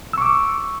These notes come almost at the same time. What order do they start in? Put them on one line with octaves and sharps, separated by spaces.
E6 C#6 D6